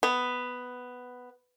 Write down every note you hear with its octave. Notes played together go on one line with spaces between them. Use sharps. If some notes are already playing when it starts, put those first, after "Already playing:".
B3